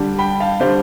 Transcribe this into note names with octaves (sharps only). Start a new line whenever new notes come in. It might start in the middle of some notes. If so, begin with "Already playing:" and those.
Already playing: D3 G3 D4
G5 B5
F5 A5
D3 G3 D4 C5